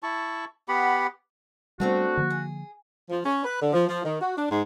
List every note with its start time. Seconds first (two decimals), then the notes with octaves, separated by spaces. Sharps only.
0.03 E4 A5 C#6
0.68 B3 G4 F#5 B5
1.80 G3 A3 B3 C4 D4 F#4
2.17 D3 F3 A#3
2.30 G#4
3.09 F3
3.23 C#4
3.44 B4
3.61 D3
3.73 F3
3.87 F3
4.03 D#3
4.20 F#4
4.36 D4
4.49 G#2